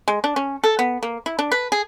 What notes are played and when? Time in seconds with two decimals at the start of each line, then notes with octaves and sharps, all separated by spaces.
0.08 G#3
0.24 D4
0.36 C#4
0.64 A4
0.79 B3
1.03 A#3
1.26 E4
1.39 D4
1.52 B4
1.72 G#4